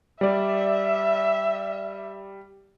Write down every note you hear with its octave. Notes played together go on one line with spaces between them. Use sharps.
G3 D5 E5